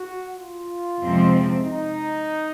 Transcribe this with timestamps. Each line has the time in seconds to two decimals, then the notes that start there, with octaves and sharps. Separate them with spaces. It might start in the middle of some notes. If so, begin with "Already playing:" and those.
Already playing: F#4
0.38 F4
1.00 F2 C3 F3 G#3 C4
1.64 D#4